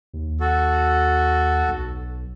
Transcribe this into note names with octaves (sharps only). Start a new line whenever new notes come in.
D#2
F#4 A4
B1